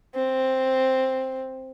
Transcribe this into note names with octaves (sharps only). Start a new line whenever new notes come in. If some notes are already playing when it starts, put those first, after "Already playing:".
C4